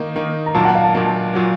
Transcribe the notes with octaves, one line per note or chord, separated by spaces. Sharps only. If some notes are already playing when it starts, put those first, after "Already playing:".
Already playing: D#3 A#3 D#4
D#3 A#3 D#4
A#5
A#2 F#3 A#3 A5
F#5
F5
A5
A#2 F#3 A#3 A5
A#2 F#3 A#3